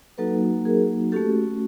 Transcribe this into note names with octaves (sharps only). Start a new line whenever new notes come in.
F#3 A#3 D#4 F#4 A4 B4
G#4 A#4
A3 C#4 F#4 G4 A4